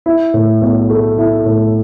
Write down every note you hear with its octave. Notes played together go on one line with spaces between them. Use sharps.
E4
A2
B1
A3
E4
A2